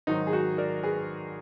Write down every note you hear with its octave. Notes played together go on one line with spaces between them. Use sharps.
G#2 D#3 F#3 D#4 F#4
G#4
D#4 F#4
A#4 D5
G#4 B4